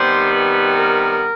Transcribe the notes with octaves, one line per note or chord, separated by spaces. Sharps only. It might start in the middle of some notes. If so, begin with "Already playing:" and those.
Already playing: C3 D#3 G3 B3 C5
B4
A#4